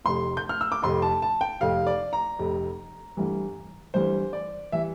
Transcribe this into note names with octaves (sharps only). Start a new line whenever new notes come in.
F1 F2 C3 C6
G6
F6
E6
D6
F1 F2 C3 C6
A5
A5
G5
F1 F2 C3 F5
D5
A#5
F1 F2 C3
G1 G2 E3 G3
G1 G2 E3 G3 C5
D5
E3 G3 E5